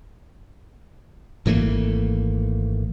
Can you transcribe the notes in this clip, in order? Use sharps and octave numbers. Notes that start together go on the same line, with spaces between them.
G#1 E3 A3 A#3